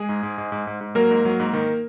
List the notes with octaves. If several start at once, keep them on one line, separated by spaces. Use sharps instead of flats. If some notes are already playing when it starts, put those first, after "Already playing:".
Already playing: G#3 G#4
G#2
G#2
G#2
G#2
G#2
G#2
F#3 A#3 A#4
G#2
F#3
G#2
D#3